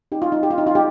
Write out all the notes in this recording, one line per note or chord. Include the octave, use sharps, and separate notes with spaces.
D#4 G4
F4
D#4
G4
F4
D#4
F4
D#4 G4